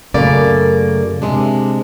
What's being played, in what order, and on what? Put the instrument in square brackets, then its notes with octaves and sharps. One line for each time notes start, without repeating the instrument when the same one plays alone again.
[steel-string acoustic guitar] F#2 C#3 A3 A#3 D5
C3 G#3 D4